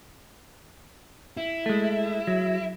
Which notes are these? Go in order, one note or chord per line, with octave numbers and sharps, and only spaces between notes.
E4
G#3 A3
F#3